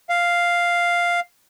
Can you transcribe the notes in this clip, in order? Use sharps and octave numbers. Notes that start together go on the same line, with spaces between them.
F5